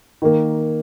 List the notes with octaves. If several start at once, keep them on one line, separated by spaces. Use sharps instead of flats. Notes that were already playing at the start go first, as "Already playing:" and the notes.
D#3 A#3